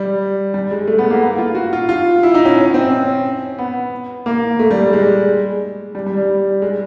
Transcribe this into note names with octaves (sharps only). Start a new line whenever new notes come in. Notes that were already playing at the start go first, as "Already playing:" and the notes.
Already playing: G3
G3
G#3
A3
B3
A#3
B3
F4
F#4
F4
F4
E4
D#4
C#4
C#4
C4
C#4
B3
A#3
A3
G3
G#3
G3
G3
G3
G#3